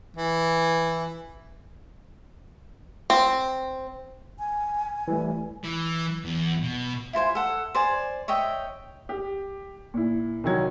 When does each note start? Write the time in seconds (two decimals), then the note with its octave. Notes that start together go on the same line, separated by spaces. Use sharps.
0.17 E3
3.10 C4
4.39 G#5
5.08 E3 G3 A3
5.64 E3
6.25 E2
6.63 B2
7.13 E4 F4 C5 G#5
7.35 A4 F#5
7.75 C5 D5 G#5
8.28 C#5 D#5 E5 G5
9.09 G4
9.94 A#2 E4
10.44 C2 D#3 F#3 G#6